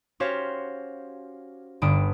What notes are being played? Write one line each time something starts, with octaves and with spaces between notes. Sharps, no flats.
C#4 F#4 G4 C5 C#5 F5
G1 G2 D3 D#6 D7